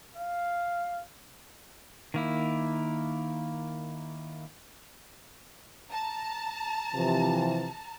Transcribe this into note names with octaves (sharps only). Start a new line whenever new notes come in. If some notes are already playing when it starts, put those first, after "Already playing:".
F5
D#3 A#3 E4
A5 A#5
C3 E3 F3